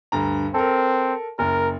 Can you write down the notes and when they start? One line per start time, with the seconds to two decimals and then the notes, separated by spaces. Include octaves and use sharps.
0.12 D2 G2 A#5
0.54 C4 A4 A#4
1.39 F#1 A#4